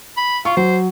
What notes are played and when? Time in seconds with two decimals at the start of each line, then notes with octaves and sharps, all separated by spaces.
0.17 B5
0.45 F4 C#6
0.57 F#3 C5